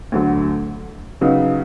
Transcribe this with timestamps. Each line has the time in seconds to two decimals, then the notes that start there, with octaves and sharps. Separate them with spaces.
0.12 D2 D3 F#3
1.21 C#3 F#3 B3 D#4